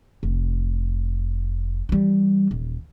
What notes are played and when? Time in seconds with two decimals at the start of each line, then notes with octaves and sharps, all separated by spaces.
0.23 F1
1.89 E3 G3
2.51 D#1